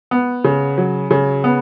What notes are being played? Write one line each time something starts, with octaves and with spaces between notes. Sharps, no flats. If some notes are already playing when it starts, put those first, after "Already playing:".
B3
C#3
F#3
C#3
B3